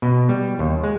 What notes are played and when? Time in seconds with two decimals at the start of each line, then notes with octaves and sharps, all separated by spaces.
0.02 B2
0.29 G3
0.59 D#2
0.83 G#3